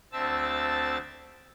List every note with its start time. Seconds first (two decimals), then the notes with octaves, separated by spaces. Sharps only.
0.13 D2 C4 E5 A5 E6 A6